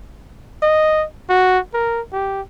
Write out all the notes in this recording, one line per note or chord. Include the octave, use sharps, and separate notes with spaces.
D#5
F#4
A#4
G4